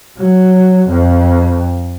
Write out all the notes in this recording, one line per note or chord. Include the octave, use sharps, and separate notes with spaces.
F#3
F2